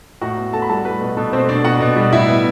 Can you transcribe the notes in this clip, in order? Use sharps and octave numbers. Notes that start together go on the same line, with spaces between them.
A2 F#4 F#5
B3
A2 A4 A5
B5
G3 A4 A5
A3 B4
B2
B2 A4
A3 C4 C5
B2 D4 D5
B3 F#4 F#5
B2
G3
A2 E4 E5
B3